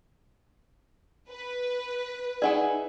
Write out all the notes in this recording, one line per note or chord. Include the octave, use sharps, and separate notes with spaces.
B4
D#4 E4 G#4 D5 F#5 G#5